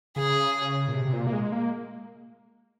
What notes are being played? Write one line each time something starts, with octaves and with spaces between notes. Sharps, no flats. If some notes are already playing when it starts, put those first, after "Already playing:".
C#3 G#4
A#2
C3
C3
A#2
A#3
G#3
A#3